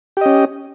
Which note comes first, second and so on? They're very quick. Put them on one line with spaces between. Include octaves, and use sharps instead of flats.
G4 D#5 C#4